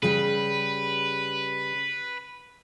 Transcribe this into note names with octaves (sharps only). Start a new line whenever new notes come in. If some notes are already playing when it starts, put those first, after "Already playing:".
C#3 G3 B4